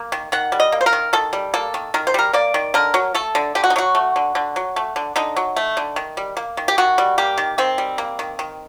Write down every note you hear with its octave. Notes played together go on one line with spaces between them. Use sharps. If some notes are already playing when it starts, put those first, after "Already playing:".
Already playing: A#3
D#3
D#3 F#5
G3
D#5
A#3
C5
A#4
D#3
D#3 A4
G3
A#3 A4
D#3
D#3 A#4
C5
G3 A#4
A#3 D5
D#3
D3 A#4
F#3
A3 A4
D3
D3 G4
F#4
D#4
F#3 F#4
A3
D3
D3
F#3
A3
D3
D3 D#4
F#3
A3
D3
D#3
G3
A#3
D#3
G4
D#3 F#4
G3
A#3 G4
D#3
D#3 C4
G3
A#3
D#3
D#3